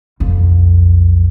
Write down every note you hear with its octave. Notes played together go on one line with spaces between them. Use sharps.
B1 F2